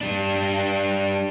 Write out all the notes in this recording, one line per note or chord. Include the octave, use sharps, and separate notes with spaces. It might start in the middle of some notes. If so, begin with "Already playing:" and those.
G3 D4